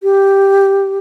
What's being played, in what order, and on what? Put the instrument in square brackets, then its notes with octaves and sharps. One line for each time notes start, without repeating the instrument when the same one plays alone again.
[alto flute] G4